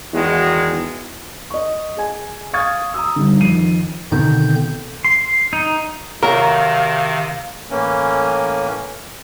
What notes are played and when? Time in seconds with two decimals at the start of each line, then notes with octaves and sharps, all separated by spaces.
0.14 E2 D#3 G#3 F#4
1.50 D#5 C#6
1.97 G#4 G#5
2.53 F5 C#6 D#6 F6 G#6 A6
2.94 A#5 D#6 E6
3.16 D3 G3 D#4
3.40 F2 D#3 C7 D#7
4.12 B2 D3 D#3 C4 G6
5.04 C6
5.53 D#4
6.23 C3 D#3 F#3 A4 A#4 F5 A#5
7.70 A2 E3 A#3 C#4